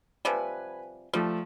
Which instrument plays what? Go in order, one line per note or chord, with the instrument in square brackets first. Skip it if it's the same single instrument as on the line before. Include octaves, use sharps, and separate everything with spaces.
[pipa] C3 F3 G3 [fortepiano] B4 G#5
[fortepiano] F3 A3 [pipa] G3